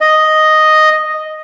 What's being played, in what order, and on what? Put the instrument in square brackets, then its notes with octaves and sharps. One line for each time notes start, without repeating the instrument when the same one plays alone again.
[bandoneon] D#5